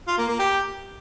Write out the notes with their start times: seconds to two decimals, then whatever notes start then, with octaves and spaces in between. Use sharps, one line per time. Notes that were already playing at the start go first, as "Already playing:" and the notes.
0.07 F4
0.18 A#3
0.28 A#3
0.39 G4